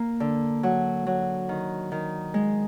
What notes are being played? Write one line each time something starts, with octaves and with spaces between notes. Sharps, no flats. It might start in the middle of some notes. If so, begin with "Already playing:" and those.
Already playing: A#3
D3
F#3
F#3
D#3
D#3
G#3